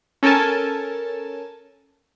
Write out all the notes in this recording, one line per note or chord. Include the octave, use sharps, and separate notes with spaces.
C#4 A4 A#4 G#5 A5